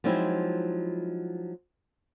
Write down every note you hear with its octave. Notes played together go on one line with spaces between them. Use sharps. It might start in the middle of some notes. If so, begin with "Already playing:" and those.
F3 F#3 G#3 C4 D#4 E4